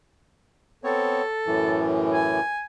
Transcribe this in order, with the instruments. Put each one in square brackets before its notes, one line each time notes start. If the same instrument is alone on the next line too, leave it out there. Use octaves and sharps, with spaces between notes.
[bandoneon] B3 C4 C#5 [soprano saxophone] A4
[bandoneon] F#2 A2 E3
[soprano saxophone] G#5